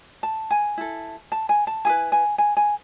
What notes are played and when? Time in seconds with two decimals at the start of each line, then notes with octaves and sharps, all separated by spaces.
0.23 A5
0.51 G#5
0.78 E4 A4
1.32 A5
1.49 G#5
1.67 A5
1.85 E4 G#4 G#5
1.89 B4
2.12 G#5
2.38 G#5
2.57 G#5